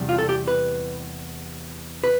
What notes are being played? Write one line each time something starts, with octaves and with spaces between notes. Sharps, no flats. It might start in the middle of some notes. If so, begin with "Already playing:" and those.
Already playing: E2 C3 G3
F4
A4
G4
B4
B4